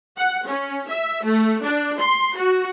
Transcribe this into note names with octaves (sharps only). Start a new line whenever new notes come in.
F#5
C#4
E5
A3
D4
C6
F#4